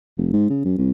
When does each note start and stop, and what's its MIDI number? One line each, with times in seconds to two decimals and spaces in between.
0.18 0.29 29
0.33 0.49 44
0.49 0.61 49
0.65 0.75 42
0.78 0.91 36